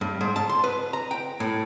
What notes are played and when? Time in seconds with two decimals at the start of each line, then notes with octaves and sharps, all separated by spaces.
0.01 G2
0.21 G#2
0.36 A5
0.49 C6
0.64 B4
0.93 A#5
1.11 G5
1.40 A2